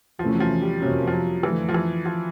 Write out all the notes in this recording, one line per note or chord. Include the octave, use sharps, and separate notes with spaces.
E2 C3 E3 F3 A3 C#4
F#3
F3
G3
F2 C3 F3 F#3 A#3 C#4
F3
F#3
F2 D3 E3 F3 A3
F3
E3
F3